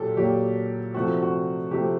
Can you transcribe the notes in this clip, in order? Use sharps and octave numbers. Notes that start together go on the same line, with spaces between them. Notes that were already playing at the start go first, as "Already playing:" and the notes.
Already playing: A#2 F#3 A#3 G4 A4
A#2 F#3 A#3 G4
C3 F3 A3 C4 F#4
F#4
C3 F3 A3 C4 G4